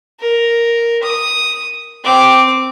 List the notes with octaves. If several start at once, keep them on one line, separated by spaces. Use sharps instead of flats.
A#4
D#6
C4 D6